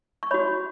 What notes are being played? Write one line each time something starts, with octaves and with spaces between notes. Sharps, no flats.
C#6
F#4 C#5 B5